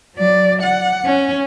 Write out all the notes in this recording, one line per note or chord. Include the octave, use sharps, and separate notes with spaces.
F#3 D5
F#5
C#4